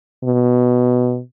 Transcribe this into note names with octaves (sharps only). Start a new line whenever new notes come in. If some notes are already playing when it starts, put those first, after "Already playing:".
B2